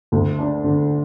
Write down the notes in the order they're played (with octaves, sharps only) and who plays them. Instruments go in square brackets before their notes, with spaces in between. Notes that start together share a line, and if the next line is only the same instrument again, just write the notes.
[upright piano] D2
D4
D3